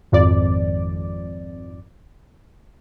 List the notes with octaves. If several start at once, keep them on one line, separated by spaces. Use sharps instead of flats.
G#1 F2 D5